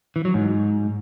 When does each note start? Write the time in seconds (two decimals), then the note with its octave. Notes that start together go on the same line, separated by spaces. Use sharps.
0.16 E3
0.25 F#3
0.34 G#2